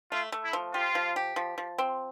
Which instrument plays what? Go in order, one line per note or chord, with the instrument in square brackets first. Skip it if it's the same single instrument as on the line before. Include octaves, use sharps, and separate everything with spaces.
[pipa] A3 [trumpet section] F4
[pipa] A3
[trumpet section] E4
[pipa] F3
[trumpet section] F4 [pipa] G4
[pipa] F3
G4
F3
F3
C4